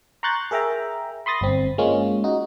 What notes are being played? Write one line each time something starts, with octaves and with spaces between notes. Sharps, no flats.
A#5 C6 C#6 F#6 G6 A6
G#4 A#4 E5 G5 A#5
B5 C6 D#6 A6 A#6
G1 C4
G#3 A#3 C#4 F4
D#4 F#4